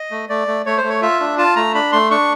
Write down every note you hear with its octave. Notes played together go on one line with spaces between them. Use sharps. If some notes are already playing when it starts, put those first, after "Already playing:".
Already playing: D#5
A3
A3 D5
A3
A3 C#5
C5
A3
C#5
F4 E5
D4
F4 A5
A3 A#5
D4 B5
A3 C6
D4 C#6